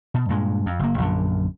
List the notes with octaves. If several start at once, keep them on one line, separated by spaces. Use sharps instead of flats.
B2
G2 A#2 G#3
F2
F#1 A#3
A#1 F#2 D3